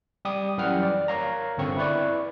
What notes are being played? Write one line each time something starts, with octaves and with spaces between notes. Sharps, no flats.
G3 G4 D#6
F#2 E3 G3 F#5 G5 F6
D5
A#4 C#5 F5 A#5
G1 D3 C4 C#6
E4 B4 D5 C#6